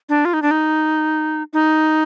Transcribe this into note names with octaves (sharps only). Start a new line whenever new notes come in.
D4
F4
D#4
D4
D#4
D#4